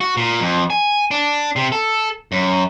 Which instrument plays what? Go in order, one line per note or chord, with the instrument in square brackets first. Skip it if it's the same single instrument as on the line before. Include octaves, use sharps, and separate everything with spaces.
[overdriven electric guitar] F#4
A#2
F2
G#5
D4
C3
A4
F#2